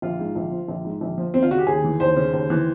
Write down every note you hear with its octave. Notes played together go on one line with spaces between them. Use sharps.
A#1 F4
G#2
A#1
F3
A#1
G#2
A#1
F3
D#2 C4
F4
C#3 F#4
G4
D#2 G#4
E3
D#2 C5
C#3
D#2
E3